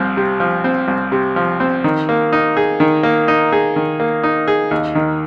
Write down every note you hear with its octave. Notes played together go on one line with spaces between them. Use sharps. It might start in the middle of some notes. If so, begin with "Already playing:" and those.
Already playing: C2 F3 C4
C3
F3
C4
C2
C3
F3
C4
D#3
A#3
D#4
G#4
D#3
A#3
D#4
G#4
D#3
A#3
D#4
G#4
D#2
D#3